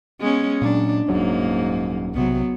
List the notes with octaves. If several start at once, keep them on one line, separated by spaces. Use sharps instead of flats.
G#3 B3 C#4
A#2 F#3 D4
D#1 G#2 F#3 A#3 C#4
B1 C3 F#3 B3